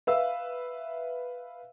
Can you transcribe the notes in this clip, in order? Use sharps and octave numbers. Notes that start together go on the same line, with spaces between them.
B4 E5 F5 E6